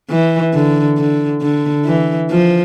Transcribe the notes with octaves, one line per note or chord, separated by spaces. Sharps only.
E3
D3
D3
D3
E3
F3